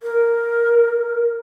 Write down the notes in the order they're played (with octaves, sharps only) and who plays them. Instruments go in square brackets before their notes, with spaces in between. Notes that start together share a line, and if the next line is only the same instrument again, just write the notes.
[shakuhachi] A#4